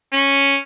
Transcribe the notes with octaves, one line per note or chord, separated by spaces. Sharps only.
C#4